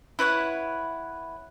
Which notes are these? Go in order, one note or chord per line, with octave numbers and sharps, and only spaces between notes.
E4 B4 C#5 F#5